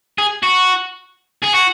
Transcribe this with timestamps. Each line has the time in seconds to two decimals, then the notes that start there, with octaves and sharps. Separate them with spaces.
0.19 G#4
0.43 F#4
1.42 G#4
1.53 F#4